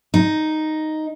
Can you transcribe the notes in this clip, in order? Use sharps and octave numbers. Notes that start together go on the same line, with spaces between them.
D#4